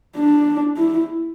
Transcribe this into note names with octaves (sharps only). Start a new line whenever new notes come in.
D4
E4